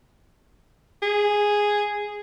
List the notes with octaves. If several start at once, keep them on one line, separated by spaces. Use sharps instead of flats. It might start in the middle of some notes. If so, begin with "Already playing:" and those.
G#4